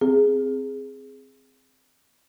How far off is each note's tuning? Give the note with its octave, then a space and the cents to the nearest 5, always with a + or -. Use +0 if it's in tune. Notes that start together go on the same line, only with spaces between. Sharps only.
C4 +0 G#4 +0